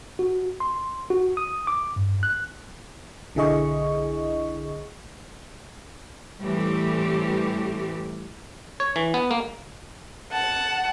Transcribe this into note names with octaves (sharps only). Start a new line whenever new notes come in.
F#4
C6
F#4
D#6
D6
G2
F#6
B1 D3 E4 G#4 D#5 C#6
A2 E3 G3 A3 C4 G4
C#5
E3
B3
A#3
F#5 A5